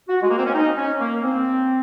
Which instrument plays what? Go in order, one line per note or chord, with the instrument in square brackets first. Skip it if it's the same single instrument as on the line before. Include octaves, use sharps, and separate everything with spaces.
[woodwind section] F#4
G#3
A#3
C4
C#4
D#4
C#4
A#3
C4